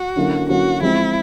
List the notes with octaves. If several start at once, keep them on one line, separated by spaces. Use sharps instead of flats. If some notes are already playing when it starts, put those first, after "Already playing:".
Already playing: F#4
D3 F#3 A#3 C#4 E4
D3 F#3 A#3 C#4 E4 F#4
F3 G#3 C4 E4